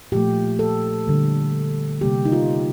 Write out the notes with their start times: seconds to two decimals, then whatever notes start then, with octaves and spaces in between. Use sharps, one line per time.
0.12 A#2 F3 A3 G4
0.59 A4
1.06 D3 G3 A#3
2.01 C3 G3 A#3 G4
2.25 D#4
2.32 F4